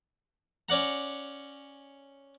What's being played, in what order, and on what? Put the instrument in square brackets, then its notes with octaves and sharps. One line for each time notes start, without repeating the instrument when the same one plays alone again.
[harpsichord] C#4 D5 F#5 A#5